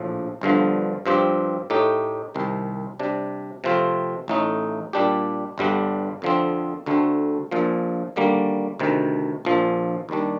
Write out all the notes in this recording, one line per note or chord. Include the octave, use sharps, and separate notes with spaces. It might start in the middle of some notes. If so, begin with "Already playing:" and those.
Already playing: A#1 A2 F3
G1 G2 D3 F3
G2 F3 C4 G4
A2 A3 D#4 G4
C2 C3 D#3
C3 G3 D4
C3 F3 A3 C4 F4
A1 A2 A3 D#4
A#2 G3 D4 G4
G1 G2 D3 G3 D4
F2 D3 F3 C4
D2 D3 A3 C4
A#1 A#2 F3
D#2 D3 G3 A#3
D2 C3 D#3
A#1 A#2 F3
D#2 D#3 G3 D4